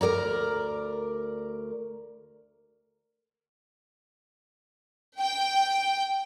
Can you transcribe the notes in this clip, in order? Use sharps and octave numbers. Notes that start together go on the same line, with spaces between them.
D2 A#4 D5 A#5
G5